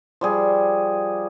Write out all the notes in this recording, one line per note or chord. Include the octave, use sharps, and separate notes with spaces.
F3 G3 G#4